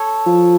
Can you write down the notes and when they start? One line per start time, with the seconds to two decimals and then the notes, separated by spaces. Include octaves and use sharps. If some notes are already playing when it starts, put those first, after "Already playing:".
Already playing: A4 C#5
0.26 F3